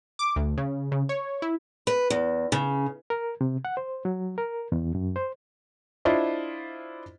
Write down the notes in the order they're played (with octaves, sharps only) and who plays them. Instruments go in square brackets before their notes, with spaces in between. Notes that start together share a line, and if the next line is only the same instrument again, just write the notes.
[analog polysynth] D6
D2
C#3
C#3
C#5
E4
[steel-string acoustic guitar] B4
E2
C#3
[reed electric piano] A#4
C3
F#5
C5
F#3
A#4
E2
F#2
C5
[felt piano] D4 E4 F4 C5 D#5